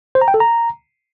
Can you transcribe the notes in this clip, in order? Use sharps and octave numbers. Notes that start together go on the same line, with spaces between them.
C5
A#5
G5
A4
A#5